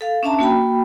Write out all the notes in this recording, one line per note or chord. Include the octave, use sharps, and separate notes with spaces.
A4 F5
C#4 D4 E5 A5 A#5
A#3 F#4 G5 B5